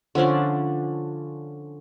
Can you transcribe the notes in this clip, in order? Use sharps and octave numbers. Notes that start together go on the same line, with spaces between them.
D3 F3 C#4 D4